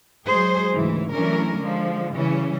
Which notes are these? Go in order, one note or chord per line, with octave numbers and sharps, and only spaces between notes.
F#3 G#3 G#4 C5
D2 G#2 C#3 E3
E3 F#3 A3 C#4 D4 A#4
D3 F3 G#3
C#3 E3 G3 C#4